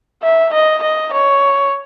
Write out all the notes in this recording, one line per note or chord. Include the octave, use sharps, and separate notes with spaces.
E5
D#5
D#5
C#5